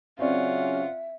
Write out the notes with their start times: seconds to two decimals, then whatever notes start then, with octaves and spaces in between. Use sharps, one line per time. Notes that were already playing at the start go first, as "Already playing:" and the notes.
0.19 C#3 F#3 C4 C#4 F4 D5 E5 F#5